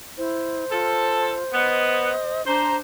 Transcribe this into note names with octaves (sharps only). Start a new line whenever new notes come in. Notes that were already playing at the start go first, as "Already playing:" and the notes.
E4 C5
F4 A4
B3 D#5
D4 C5 A#5